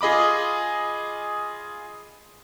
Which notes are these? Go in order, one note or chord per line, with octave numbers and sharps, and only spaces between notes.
F4 G#4 D#5 B5 D6